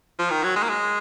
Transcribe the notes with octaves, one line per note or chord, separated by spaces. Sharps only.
F3
D#3
F#3
G#3
A#3
G#3